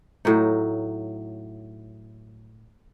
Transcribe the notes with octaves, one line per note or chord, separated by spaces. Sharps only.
A2 F#3 D#4